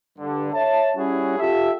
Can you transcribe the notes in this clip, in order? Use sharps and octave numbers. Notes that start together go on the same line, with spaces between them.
G2 D3
C#5 E5 A5
G3 C#4 E4 F#4 G#4
F4 G4 A4 E5